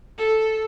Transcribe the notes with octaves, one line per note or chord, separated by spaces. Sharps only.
A4